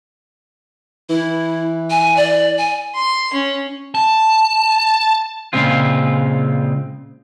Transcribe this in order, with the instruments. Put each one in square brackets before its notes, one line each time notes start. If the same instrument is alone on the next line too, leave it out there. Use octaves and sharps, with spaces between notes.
[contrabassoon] E3 [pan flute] E4
[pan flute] G#5
D5
G#5
[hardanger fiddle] C6
C#4
[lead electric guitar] A5
[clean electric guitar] A#2 C#3 G#3 C4 F4